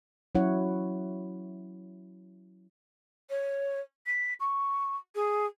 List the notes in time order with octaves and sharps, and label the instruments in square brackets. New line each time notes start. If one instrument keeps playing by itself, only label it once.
[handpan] F#3 C#4 E4 C#5 F#5
[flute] C#5
B6
C#6
G#4